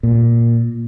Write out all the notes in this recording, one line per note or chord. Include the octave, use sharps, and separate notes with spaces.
A#2